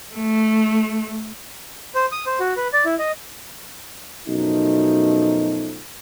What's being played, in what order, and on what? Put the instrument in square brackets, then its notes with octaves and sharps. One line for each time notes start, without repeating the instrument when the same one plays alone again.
[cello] A3
[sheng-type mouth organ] C5
D#6
C5
F#4
B4
D5
E4
D#5
[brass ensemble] F#2 B2 F3 A3 D#4